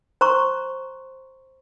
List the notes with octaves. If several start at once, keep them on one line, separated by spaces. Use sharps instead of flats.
C5 A#5 C6 C#6